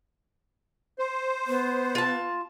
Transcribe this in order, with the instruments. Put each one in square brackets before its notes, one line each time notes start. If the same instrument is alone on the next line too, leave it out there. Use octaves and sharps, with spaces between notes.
[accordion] C5
[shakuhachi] B3
[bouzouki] F4 A5